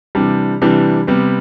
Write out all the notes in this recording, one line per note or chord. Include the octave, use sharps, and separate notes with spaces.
C3 E3 G3 D4
C3 E3 G3 D4
C3 G3 B3